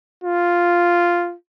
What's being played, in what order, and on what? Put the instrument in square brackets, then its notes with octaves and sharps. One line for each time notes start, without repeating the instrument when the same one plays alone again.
[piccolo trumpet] F4